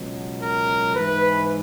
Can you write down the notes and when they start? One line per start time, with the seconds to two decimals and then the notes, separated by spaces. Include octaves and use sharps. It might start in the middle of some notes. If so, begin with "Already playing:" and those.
Already playing: C#2 B2 F#3
0.42 A#4
0.96 G#2 E3 B4